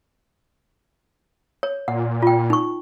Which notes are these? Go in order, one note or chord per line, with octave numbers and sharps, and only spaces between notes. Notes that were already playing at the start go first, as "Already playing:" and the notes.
C#5
A#2 F#5
F4 G5
D#4 C#6